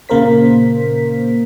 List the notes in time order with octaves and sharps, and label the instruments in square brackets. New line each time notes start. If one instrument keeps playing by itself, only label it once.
[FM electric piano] A#2 C#3 A#3 A#4 C5 B6